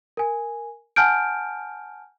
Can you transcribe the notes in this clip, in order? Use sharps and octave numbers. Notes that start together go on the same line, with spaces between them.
A#4 G#5
F#5 G#5 A5 F6 G6 D7